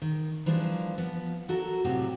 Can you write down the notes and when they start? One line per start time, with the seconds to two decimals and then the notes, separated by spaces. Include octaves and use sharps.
0.02 D#3
0.46 E3 F3 G3 A#3 D4
0.98 F3 B3
1.48 F#3 F#4 A4 A#4
1.84 A2 C3 F3 F#3 F#4 G4